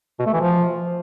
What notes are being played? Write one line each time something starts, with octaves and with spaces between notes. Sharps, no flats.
B2
A3
E3
F3